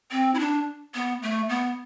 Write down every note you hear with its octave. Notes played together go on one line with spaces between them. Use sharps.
C4
E4
D4
B3
A3
B3